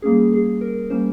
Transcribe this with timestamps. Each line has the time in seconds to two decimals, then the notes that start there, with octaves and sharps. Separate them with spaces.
0.02 G3 A#3 C#4 G#4
0.32 G#4
0.61 A#4
0.90 G3 A#3 C#4 C5